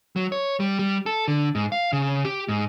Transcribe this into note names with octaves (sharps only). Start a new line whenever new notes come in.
F#3
C#5
G3
G3
A4
D3
G#2
F5
C#3
G4
G#2